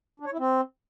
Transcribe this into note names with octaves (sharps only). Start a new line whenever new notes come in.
D4
C#5
E4
C4